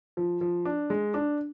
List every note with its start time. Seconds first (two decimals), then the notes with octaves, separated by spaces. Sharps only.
0.17 F3
0.41 F3
0.65 D4
0.90 G#3
1.14 D4